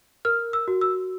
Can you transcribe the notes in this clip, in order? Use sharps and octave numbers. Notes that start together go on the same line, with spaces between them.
A#4 F6
E6
F#4
E6